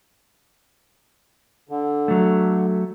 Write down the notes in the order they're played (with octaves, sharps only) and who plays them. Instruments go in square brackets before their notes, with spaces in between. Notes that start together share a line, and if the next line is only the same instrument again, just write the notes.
[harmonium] D3
[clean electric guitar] F#3 A3